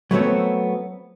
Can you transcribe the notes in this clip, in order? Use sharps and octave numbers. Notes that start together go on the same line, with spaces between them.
F#3 A3 B3 C4 C#5